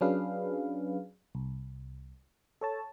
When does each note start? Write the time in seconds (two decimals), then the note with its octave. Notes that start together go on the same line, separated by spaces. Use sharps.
0.01 F#3 C#4 D4 G#4 B4 F5
1.35 C2
2.61 A4 C#5 A5